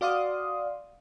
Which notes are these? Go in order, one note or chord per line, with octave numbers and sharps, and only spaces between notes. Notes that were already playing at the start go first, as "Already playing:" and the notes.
F#4 D5 F5 C6 D#6